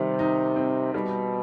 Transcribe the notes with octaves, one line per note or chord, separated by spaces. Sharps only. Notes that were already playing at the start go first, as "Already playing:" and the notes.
Already playing: C3 D#3 G3
D#4
C4
B2 G3